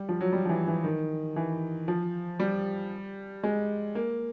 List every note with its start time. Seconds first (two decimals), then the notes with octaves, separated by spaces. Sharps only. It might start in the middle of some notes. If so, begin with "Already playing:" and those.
Already playing: G3
0.09 F3
0.21 F#3
0.33 G3
0.45 F3
0.49 E3
0.67 E3
0.84 D#3
1.36 E3
1.88 F3
2.40 G3
3.43 G#3
3.95 A#3